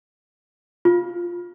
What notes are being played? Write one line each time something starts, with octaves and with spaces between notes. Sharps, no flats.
F4